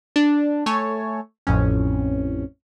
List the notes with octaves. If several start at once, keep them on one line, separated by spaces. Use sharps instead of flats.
D4
A3 C#5 G#5 A5
A1 F2 C#4